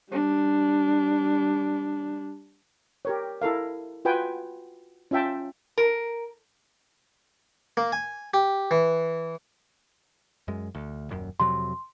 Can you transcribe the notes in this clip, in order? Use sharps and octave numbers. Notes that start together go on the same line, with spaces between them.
G3 D4
G4 A#4 C#5
E4 A4 A#4 F5
F4 F#4 B4 G5 G#5
C#4 F4 E5 G5 A5
A#4
A#3
G#5
G4
E3
F#2 G#3
D2
D#1 F#2
F2 C3 F#3 C6